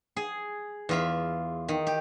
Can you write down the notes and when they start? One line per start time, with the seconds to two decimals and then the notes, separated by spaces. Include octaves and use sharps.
0.16 G#4
0.89 E2 F4 E5
1.68 D#3
1.87 G4